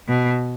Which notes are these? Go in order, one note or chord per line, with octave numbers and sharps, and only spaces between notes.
B2